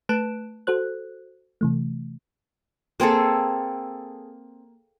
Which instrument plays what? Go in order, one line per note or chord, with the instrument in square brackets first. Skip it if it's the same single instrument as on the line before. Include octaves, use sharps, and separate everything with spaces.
[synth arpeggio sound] A3 B4 A5 F#6 D7 E7
F#4 A4 C5 F#6
C3 E3 A3
[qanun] A#3 C4 G#4 A4